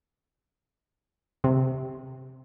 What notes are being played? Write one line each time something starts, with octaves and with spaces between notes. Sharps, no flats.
C3